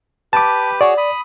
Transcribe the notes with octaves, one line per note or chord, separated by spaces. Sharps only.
G4 B4 A5 D6
F#4 G#4 C#5 D5
B5 D#6